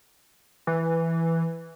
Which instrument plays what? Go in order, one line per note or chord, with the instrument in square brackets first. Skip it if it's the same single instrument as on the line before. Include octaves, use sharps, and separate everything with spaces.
[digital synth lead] E3